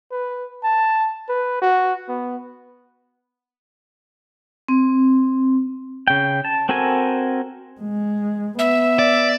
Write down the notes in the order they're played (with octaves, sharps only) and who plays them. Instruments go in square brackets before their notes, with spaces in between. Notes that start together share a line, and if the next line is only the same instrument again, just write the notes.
[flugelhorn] B4
A5
B4
F#4
B3
[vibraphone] C4
[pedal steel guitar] C#3 G5
A5
C4 F#4 A4 A#4 G#5
[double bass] G#3
[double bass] B3 [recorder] E5
[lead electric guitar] D5